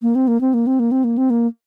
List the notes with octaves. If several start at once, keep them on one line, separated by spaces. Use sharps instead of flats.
A#3
C4
A#3
C4
A#3
C4
A#3
C4
A#3
C4
A#3